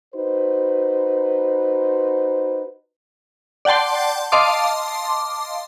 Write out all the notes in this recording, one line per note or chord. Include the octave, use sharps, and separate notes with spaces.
D#4 F#4 B4 C5
D5 F#5 G5 A5 C6
D#5 F5 A5 C6 D6